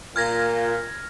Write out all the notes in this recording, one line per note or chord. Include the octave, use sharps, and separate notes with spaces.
A#2 F4 A#4 F6 G#6 A#6